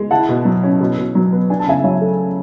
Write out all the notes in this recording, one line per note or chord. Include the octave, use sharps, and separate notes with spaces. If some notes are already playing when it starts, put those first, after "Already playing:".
Already playing: G#3
E4 F#5 A5
B2
F#3
C#4
B2
B2
F#3
B3
D4 G#5
A5
C#3 E5 G#5
F#3 C#5 E5
A3